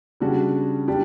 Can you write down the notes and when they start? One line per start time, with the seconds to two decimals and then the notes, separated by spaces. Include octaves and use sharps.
0.20 C#3 G3 D4 F#4
0.88 G3 D4 G4